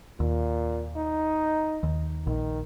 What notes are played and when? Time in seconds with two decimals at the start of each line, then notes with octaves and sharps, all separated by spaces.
0.20 D#2 A#2
0.97 D#4
1.83 D#2
2.27 A#1 D#3